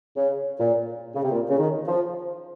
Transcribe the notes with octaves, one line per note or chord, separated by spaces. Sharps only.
C#3
A#2
C#3
C3
A#2
C#3
D#3
F3